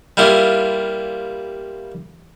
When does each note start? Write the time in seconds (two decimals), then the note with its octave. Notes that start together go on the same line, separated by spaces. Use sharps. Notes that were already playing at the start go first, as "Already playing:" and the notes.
0.17 G3 A#3 E4 F4